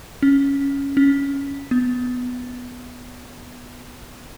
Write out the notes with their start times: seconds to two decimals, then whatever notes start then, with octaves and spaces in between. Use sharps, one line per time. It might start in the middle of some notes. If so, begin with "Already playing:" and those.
0.22 C#4
0.97 C#4
1.71 B3